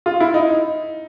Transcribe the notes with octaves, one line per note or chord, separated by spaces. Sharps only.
F4
E4
D#4